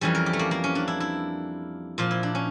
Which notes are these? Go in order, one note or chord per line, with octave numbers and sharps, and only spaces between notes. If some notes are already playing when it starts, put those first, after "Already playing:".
F2 E3 G3 C#4
A#4
G4
A3
A#3
A#3
C#4
D4
E4
E4
A#2 F3 F4
E4
D4
C#4